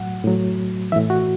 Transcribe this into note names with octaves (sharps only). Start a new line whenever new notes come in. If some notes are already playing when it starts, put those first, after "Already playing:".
Already playing: A2 F#3 F#5
A2 F#3
A2 E3 E5
F#4